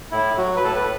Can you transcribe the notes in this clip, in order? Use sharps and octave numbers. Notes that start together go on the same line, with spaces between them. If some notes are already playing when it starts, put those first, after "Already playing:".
A2 E4
F#3 F#4
B4
A2 A4
B4